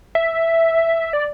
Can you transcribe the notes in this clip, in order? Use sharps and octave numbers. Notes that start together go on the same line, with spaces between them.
E5
D5